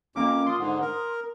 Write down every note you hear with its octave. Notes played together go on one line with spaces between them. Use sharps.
F2 A#3 C#4 D6
F4 C6 D#6
G#2 D3
A#4